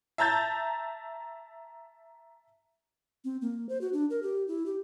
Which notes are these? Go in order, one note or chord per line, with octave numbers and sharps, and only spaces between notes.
E5 A5 A#5 G6 A6
C4
A#3
C5
F#4
D4
A#4
G4
E4
G4